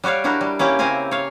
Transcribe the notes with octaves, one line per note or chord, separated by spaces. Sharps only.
G3 F#4 G4 C#5 F5
D4 E4 F#4 G4 A#4
G3
A#3 C#4 E4 G4
C#3 C4 G4 A#4 C5 G#5
C#5 F5